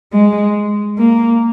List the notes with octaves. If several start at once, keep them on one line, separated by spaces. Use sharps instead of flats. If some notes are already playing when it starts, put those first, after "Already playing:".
G#3
A#3